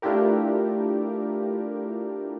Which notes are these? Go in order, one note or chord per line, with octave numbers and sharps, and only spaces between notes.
A3 D4 E4 F4 G4 A#4